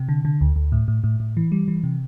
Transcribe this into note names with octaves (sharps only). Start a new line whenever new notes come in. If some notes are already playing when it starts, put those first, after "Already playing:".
Already playing: C3
D3
D3
D2
D2
A2
A2
A2
A2
E3
G3
E3
C3